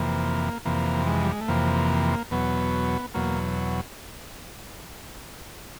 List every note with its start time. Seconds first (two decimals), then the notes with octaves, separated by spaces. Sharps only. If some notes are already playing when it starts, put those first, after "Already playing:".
Already playing: F2 C3 E3 A#3
0.65 F2 C3 E3 A#3
1.07 G#3
1.24 G3
1.32 G#3
1.41 A3
1.48 F2 C3 E3 A#3
2.31 E2 B2 F#3 B3
3.14 E2 B2 F#3 A#3